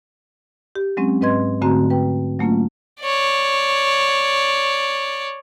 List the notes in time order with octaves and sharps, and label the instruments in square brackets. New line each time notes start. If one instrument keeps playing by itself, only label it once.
[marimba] G4
F#3 G#3 C4 C#4
G#2 C4 B4 D#5 C6 G#6
G#2 D3 A3 C4 F#4 A#5
B4 G5
F#3 A3 A#3 C#4 F4
[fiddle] C#5 D5